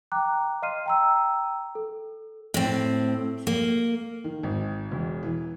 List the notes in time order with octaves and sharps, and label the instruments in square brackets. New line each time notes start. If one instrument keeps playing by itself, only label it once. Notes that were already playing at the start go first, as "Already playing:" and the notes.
[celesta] G5 A#5 D6 F#6
D#5 F5 C6 F6 C7 D#7
G5 A#5 E6
A4
[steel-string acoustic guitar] A2 C4
A#3
[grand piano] D#3
G#1
E1
E3